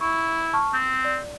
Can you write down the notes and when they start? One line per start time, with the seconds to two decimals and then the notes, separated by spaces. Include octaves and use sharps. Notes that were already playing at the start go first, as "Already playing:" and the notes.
0.01 E4 C#6
0.53 A5 C#6 F6
0.74 C4 G6
1.05 D5